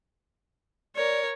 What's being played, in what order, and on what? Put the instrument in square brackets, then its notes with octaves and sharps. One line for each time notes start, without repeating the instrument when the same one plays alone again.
[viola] A#4 C#5 [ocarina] D5